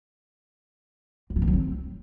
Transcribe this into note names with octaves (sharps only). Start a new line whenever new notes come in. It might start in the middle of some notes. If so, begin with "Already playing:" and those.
F#3
F3
E3
F#3
C4